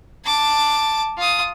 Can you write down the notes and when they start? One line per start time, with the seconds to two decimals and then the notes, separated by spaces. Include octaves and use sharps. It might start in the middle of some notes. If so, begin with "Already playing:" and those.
0.25 A5 D6
1.17 F4 D#6